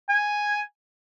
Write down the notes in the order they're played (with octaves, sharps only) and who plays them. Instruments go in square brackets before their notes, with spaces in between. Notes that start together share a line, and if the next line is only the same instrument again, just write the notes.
[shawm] G#5